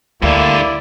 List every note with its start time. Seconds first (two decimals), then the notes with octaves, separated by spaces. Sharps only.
0.22 D2 G2 D3 A#3 E4 D5